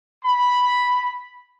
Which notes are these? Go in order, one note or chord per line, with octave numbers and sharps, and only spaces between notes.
B5